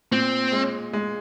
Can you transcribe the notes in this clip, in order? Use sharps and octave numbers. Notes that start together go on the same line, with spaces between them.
A#2 C4
G#3
G#3